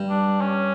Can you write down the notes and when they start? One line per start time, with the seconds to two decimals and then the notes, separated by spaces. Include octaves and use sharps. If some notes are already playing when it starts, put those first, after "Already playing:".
Already playing: G2
0.10 D4
0.41 C#4